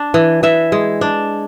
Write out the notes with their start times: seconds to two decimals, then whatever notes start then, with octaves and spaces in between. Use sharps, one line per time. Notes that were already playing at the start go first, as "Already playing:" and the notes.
Already playing: D4
0.14 E3
0.43 E3 E5
0.72 G#3
1.01 D4